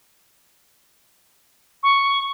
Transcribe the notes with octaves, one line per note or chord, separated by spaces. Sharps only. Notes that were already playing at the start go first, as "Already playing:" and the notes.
C#6